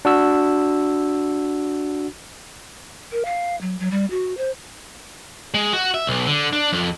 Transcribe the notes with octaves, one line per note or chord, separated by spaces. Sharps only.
D4 F#4 E6
A#4
F5
F#3
F#3
G3
F#4
C5
G#3
F#4
E5
B1
D3
D4
F2